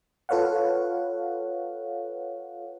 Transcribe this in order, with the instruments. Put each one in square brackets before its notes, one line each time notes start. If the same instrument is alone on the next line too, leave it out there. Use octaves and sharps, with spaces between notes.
[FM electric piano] F4 A4 B4 C#5 F5 F#5